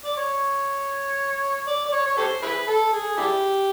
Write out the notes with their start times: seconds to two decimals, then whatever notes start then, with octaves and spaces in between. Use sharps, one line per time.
0.05 D5
0.17 C#5
1.68 D5
1.85 D5
1.92 C#5
2.06 C#5
2.17 G4 A4 C5
2.42 E4 G#4 B4
2.67 A4
2.93 G#4
3.18 D4 E4 G4